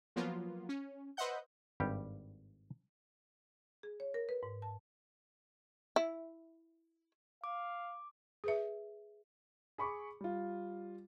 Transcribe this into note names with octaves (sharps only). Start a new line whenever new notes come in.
F3 F#3 A#3 B3 F4
C#4
B4 C5 D#5 E5 F#5 G6
G#1 G2 G3 G4
G#4
C#5
A#4
B4
G#2
A5
E4
F5 D6
G#4 B4 E5
G#4 B5 C#6 D6
G3 F4